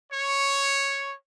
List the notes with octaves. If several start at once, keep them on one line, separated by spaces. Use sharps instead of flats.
C#5